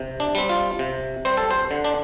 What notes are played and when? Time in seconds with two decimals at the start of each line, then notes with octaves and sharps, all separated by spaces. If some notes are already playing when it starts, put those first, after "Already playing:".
Already playing: C3
0.20 D4
0.35 G3 C4
0.49 F4
0.79 C3
1.25 G3 C4 C5
1.37 A4
1.51 C5
1.71 D3
1.84 D4